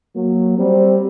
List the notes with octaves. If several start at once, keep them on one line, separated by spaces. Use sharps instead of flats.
F#3 A#3
G3 C4